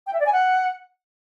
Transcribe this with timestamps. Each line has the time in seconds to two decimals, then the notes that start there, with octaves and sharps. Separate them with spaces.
0.07 G5
0.13 E5
0.20 D5
0.26 G#5
0.33 F#5